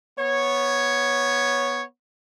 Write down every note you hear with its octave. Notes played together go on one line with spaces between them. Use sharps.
B3 C#5